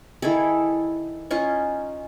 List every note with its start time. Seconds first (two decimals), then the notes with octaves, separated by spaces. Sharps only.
0.22 D#3 E4 G#4 A4
1.31 C#4 D#4 F4 C#6